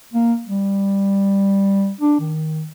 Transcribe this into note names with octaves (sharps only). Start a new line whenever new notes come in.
A#3
G3
D4
D#3